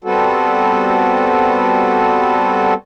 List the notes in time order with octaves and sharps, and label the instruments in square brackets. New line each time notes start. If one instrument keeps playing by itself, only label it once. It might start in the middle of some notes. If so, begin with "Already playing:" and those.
[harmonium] G3 B3 C4 F#4 A4